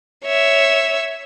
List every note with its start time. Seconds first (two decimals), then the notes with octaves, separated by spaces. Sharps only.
0.25 C#5 E5